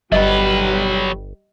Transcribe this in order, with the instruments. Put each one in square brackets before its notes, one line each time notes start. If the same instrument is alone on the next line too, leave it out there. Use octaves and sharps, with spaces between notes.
[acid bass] G1 [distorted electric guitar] F#3 B4 [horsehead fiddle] G3 [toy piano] D#5